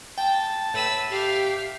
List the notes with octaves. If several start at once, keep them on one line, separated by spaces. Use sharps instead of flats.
G5 A5
A2 B4 E6
G4 E5 F5